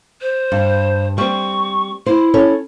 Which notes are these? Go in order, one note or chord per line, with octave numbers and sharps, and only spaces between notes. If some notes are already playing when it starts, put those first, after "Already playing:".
C5
G2
G3 C4 C#6
E4 C5
C#4 A4 C#5